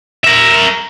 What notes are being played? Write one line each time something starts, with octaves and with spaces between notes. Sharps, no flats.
A#4 E5